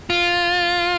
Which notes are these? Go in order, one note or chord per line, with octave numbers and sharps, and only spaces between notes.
F4